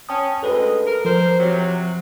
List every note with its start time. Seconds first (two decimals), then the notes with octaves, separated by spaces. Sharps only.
0.09 C#4 G5 A5 D#6
0.43 D2 G#3 A4 B4 D#5
0.87 A#4
1.05 F3 A#4 C5
1.38 C3 F#3